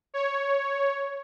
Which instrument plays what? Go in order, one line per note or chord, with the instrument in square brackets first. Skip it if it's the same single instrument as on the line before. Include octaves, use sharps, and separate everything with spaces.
[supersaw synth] C#5